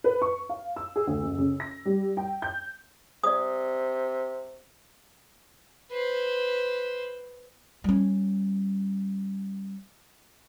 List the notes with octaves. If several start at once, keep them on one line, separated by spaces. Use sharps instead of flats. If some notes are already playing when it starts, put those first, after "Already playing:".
B4
C#6
F5
E6
G#4
D2
F#1
C#3
A#6
G3
G5
G6
C3 D5 D#6
B4 C5
G3 C#4